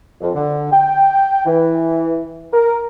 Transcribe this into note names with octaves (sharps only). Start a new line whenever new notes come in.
F2
D3
G5
E3
A#4